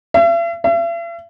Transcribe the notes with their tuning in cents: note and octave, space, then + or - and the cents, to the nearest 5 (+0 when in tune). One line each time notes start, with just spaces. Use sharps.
E5 +45
E5 +45